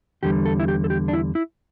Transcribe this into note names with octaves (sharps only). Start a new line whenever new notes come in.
E2 D3 G3 G4
A4
E4
G4
A4
G4
D4
E4
E4